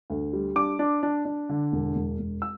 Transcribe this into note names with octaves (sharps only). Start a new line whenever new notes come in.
D2
G3
D4 D6
D4
D4
D4
D3
E1
E1
E1
E6